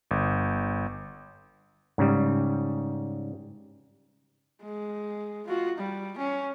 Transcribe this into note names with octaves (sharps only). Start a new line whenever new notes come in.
G1
G#2 C#3 G3
G#3
F4 F#4
G3
C#4